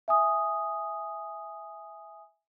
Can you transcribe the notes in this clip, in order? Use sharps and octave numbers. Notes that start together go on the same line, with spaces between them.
E5 G#5 D#6